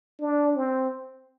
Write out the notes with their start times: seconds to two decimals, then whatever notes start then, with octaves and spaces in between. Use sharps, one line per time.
0.20 D4
0.56 C4